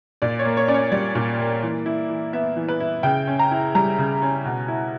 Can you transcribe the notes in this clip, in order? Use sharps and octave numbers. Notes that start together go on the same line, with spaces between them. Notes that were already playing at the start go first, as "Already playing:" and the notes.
A#2 D5
C#5
A#3
C#5
C#4 D5
C#5
G3 D5
A#2
A#3
E3
E4
E3
B3 E5
E3
B4
E4
C#3 G5
C#4
A#5
E4
G3 A#5
C#3
C#4
B2
E4